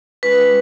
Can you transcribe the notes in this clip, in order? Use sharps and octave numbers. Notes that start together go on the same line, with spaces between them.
G#3 C#4 F4 B4